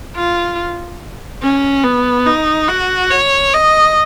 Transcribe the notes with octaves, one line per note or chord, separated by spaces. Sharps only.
F4
C#4
B3
D#4
F#4
C#5
D#5